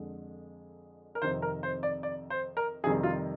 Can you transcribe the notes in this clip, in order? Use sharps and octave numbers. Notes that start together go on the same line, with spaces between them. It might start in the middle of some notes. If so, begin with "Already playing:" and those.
Already playing: F2 D3 G#3
A#4
F2 C3 D#3 C5
A#4
C5
D5
D5
C5
A#4
F2 C3 D#3 G3 G#4
F4